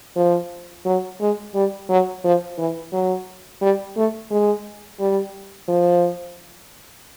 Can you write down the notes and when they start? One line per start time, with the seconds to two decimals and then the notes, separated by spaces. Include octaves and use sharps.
0.16 F3
0.85 F#3
1.20 G#3
1.54 G3
1.89 F#3
2.24 F3
2.58 E3
2.92 F#3
3.61 G3
3.96 A3
4.30 G#3
4.99 G3
5.68 F3